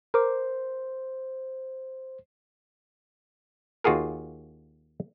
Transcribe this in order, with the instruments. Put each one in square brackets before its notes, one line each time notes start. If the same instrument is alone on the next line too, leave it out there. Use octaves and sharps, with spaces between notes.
[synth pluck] A#4 D6 [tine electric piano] C5
[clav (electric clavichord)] D#2 F4 F#4 G#4 A#4